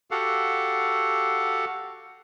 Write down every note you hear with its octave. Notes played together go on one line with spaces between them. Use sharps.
F#4 G4 A4 F5 F#5